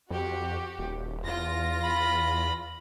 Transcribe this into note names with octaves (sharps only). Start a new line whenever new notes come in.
F2 F#4 G4
D#1
E2 F4 A#6
B5